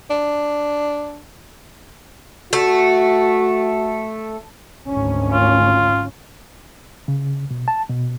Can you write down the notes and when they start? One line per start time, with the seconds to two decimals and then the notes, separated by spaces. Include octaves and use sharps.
0.10 D4
2.53 A3 F#4
4.91 G#1 D2 C#4
5.33 F4
7.08 C#3
7.51 B2
7.68 A5
7.89 B2